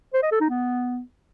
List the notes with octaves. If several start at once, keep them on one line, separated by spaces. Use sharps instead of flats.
C5
D#5
A4
D#4
B3